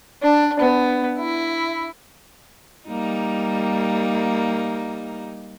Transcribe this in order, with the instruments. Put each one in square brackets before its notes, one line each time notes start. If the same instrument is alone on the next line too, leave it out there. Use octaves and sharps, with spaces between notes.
[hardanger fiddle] D4
B3
E4
[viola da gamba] G3 A#3 D#4